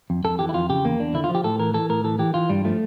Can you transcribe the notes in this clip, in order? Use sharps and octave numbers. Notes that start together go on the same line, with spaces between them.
F2
F2 A4
E3 G4
E4
F2 F4
C#3 G4
E2 A#3
E2 D4
D3 E4
F4
F3
G4
A2 A4
E3 A#4
E3 A4
A2 A#4
E3 A4
E3 G4
E3 F4
G2 G3
F3 A3